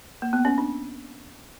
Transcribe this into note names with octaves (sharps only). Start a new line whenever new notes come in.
A#3
B3
C#4
D4